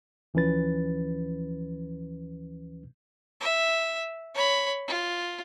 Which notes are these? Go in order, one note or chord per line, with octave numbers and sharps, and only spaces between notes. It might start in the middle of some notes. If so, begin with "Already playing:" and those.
D2 E3 F3 C#4 B4 A6
E5
C#5 B5
F4